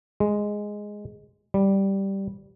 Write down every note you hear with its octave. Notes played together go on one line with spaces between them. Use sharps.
G#3
G3